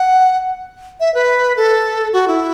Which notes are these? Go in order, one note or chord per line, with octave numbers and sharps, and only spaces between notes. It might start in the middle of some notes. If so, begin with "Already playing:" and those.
Already playing: F#5
E5
B4
A4
F#4
E4